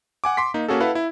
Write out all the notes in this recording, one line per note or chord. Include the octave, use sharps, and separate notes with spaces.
F#5 G#5 D6
C6 D6 B6
A#3 D#4
A#3 C#4 F#4 G#4 A4
E4 A4 B4 F5 F#5
E4